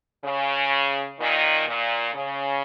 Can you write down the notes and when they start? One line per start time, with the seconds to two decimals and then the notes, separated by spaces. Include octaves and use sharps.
0.23 C#3
1.19 A#2 D#3
1.66 A#2
2.13 C#3